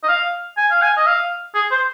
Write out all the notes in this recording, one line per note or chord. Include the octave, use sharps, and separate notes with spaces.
D#5
F5
G#5
F5
G#5
D#5
F5
G#4
C5